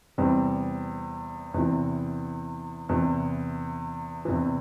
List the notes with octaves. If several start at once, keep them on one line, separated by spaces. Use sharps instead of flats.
E2 C3 G3 C4
E2 C3 E3
E2 C3 E3
E2 C3 E3